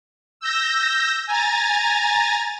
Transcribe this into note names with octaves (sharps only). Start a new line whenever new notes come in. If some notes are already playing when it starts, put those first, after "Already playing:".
E6 G6 A#6
G#5 A#5 A6